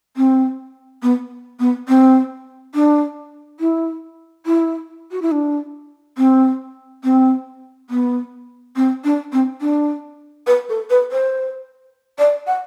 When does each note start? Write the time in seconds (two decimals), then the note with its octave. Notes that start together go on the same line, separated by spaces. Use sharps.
0.17 C4
1.02 B3
1.59 B3
1.88 C4
2.75 D4
3.60 E4
4.46 E4
5.11 F#4
5.22 E4
5.31 D4
6.18 C4
7.04 C4
7.90 B3
8.76 C4
9.04 D4
9.32 C4
9.61 D4
10.47 B4
10.69 A4
10.90 B4
11.12 C5
12.18 D5
12.47 F#5